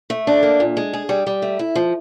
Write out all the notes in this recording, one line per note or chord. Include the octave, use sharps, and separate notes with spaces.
A3
D4
A#3
A#2
G#3
G#4
G3
G3
A3
E4
F3